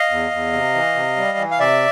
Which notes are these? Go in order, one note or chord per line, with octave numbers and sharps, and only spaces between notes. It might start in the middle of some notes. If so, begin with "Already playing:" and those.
Already playing: D#5 F5
E2
E2
C3
E3
C3
G3
E3
F5
C3 D5 E5